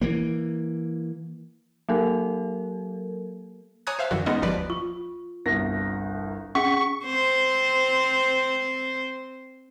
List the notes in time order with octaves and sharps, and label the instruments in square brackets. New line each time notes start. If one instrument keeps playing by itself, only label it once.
[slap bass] E3 A#3
[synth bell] F#3 A#3 A4 A#4
[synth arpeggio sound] C#5 G#5 A#5 D#6 F#6 G#6
C5 E5 F5
F#2 D3 E3 F#4
G#3 B3 C#4 D#4 D#5
G1 D#2 F3 B4 D5
[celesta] F4 [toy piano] C#6
[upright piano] G1 C2 A#6
[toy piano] C#4 G#4 [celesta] F#5 B6 [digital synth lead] C#6
[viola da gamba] C4 C5